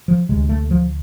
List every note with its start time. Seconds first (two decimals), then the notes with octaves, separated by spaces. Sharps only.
0.08 F3
0.29 D2 C3 G#3
0.49 A3
0.71 F3